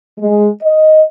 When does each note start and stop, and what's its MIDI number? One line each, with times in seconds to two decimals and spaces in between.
0.19 0.48 56
0.63 1.02 75